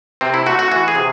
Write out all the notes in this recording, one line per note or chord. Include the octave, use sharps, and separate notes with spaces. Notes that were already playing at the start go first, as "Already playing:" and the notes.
C3 C4
E4
A3 F#4
F#4
E3 F#4
G#4
C3